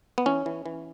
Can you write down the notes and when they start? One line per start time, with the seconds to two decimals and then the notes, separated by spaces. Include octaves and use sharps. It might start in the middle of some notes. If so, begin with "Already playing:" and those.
0.18 B3
0.26 E3 C#4
0.46 E3
0.66 E3